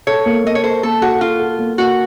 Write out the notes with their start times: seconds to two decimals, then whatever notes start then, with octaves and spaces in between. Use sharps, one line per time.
0.07 A4 C#5
0.26 A#3
0.44 A#3 D#5
0.55 C#5
0.63 A4 C5
0.83 A#3 A4
1.02 F#4 A4
1.21 F4 A4
1.40 A4
1.59 A#3
1.78 A#3 F#4